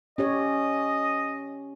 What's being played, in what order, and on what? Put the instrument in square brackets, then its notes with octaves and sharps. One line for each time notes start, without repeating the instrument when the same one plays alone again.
[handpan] C#4 G4 C#5 [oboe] D#5